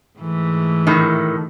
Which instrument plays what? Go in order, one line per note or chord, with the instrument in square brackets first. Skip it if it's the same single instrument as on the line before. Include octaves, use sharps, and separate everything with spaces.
[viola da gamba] G#2 E3 A3
[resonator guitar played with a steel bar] A2 D#3